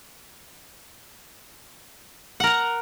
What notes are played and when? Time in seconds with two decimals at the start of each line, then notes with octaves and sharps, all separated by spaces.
2.40 F#5
2.44 A#4
2.47 A#5